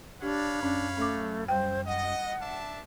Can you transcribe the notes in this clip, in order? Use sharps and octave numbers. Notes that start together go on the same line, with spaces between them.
D4 G4 C#5 F5 B5
F#2 C#4 D4
A3 C#4 D6
G3 C5 G5
D#5 F#5
D4 E5 A5